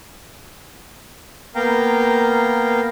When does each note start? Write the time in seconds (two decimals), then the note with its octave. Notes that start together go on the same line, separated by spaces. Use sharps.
1.55 A#3 B3 F5 G5 A#5